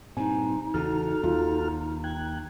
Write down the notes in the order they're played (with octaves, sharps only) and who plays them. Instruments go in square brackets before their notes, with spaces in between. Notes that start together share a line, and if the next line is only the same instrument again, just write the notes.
[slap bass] G2 [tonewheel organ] A#2 G3 C4 [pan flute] D#4 [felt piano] G#5
[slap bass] E2 C#3 E3 [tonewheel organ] F#4 A4 F6
[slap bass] D#2 [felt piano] F4
[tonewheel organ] G5 F#6 G#6